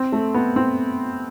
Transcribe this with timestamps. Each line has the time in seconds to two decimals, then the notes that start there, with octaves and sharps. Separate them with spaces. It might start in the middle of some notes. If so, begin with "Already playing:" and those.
Already playing: C4
0.12 A3
0.34 B3
0.56 C4